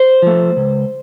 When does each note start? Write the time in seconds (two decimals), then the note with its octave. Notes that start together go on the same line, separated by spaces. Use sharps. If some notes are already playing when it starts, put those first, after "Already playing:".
Already playing: C5
0.22 F3 A3
0.57 C#2